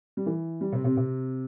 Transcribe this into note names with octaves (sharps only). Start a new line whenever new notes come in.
G3
E3
G3
C3 C4
C3 C4
C3 C4